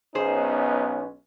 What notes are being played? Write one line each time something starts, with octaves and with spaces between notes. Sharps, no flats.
B1 B3 C#4 D#4 G#4 C5